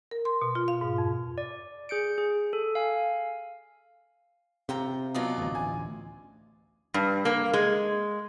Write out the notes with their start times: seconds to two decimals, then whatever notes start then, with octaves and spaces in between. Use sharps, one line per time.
0.11 A#4
0.25 C6
0.42 B2
0.55 F4
0.68 F5
0.81 G#2
0.98 F2
1.38 D5
1.89 G#4 G6 C#7 D7
2.18 G#4
2.53 A4
2.75 F5 G#5
4.69 C3 F4 G5 A#5
5.15 B2 F#3 F4 D5 D#5
5.38 A1 D2
5.55 G#5
6.94 G2
7.25 A#3
7.54 G#3